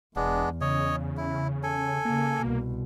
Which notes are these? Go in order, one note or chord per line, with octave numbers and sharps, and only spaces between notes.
E1 E2 G#3 B3 D4
C#3 C#5 D#5
E4
A4 G#5
C#3 A#3
C2 B2